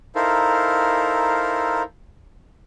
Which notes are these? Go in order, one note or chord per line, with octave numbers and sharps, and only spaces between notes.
D#4 E4 A4 A#4 C5 F5